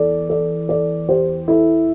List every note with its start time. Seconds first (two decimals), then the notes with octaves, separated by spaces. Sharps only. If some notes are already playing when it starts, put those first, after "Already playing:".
Already playing: E2 A4 D5
0.29 A4 D5
0.69 A4 D5
1.09 G4 C5
1.48 E4 A4